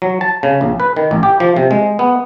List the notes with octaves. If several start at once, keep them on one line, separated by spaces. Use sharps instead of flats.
F#3
A5
C#3
A#1
B4
D#3
A1
G4
F3
C3
G#3
B3